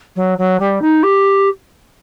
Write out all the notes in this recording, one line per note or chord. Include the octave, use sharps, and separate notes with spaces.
F#3
F#3
G3
D#4
G4